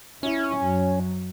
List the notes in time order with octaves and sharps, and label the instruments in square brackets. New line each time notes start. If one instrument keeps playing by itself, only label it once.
[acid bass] C#4 [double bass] E4
[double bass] F#2 F#3